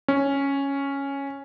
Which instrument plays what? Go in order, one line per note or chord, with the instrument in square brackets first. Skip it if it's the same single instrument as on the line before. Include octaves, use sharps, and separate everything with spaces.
[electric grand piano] C#4